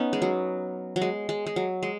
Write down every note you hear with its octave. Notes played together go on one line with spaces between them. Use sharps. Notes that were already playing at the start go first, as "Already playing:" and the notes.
Already playing: B3 C#4 D#4
G#3
F#3
F#3
G#3
G#3
G#3
F#3
G#3